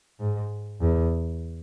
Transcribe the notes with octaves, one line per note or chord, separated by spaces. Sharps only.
G#2
E2